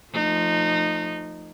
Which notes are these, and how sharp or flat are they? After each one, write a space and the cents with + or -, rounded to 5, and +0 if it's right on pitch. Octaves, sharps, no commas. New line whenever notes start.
F3 +0 A3 +10 D#4 -20